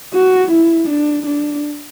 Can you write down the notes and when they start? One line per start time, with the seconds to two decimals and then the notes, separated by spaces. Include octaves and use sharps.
0.14 F#4
0.52 E4
0.89 D4
1.26 D4